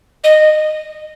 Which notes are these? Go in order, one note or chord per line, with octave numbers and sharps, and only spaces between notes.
D#5